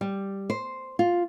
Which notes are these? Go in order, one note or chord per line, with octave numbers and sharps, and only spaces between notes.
G3
C5
F4